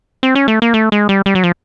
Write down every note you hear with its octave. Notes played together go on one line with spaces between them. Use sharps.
C4
C#4
A3
A#3
A3
G#3
G3
G3
F#3
F3